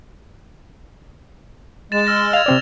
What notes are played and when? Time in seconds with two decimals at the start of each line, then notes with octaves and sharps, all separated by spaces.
1.92 G#3 A6 E7
2.07 E6 F6 A#6
2.33 F5 G#6 F7
2.46 C3 C4 D5